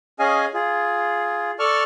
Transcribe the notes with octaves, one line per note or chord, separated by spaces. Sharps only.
C#4 G#4 D#5 F5 G#5
F4 G#4
A4 D5 A5 C#6 F6